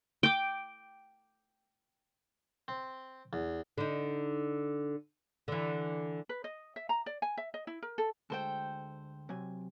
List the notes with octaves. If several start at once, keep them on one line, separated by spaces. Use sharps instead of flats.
G5 D6
C4
E2
D3 D#4
D3 E3
B4
D#5
E5
A#5
D5
G#5
E5
D#5
E4
A#4
A4
D2 G#3 A4 C5 G5
C3 F#3 G#5